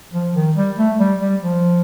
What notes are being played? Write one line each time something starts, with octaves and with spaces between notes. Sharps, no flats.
F3
D#3
G3
A3
G3
G3
F3